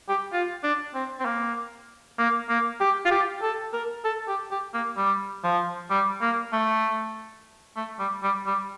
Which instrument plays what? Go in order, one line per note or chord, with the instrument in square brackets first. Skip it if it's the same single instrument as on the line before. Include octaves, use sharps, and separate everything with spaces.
[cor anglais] G4
F4
D4
C4
C4
A#3
A#3
A#3
G4
F4
G4
A4
A#4
A4
G4
G4
A#3
G3
F3
G3
A#3
A3
A3
G3
G3
G3